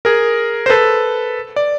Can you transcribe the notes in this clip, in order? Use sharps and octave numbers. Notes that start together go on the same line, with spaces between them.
G#4 A#4
C5
A4 B4
D5